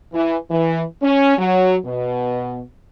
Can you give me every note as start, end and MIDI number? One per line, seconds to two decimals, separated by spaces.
0.14 0.36 52
0.51 0.82 52
1.02 1.35 61
1.39 1.77 54
1.85 2.61 47